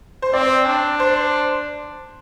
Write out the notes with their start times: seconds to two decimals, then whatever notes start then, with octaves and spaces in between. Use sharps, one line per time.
0.22 C5
0.33 C4 D5
0.66 D4
1.00 C5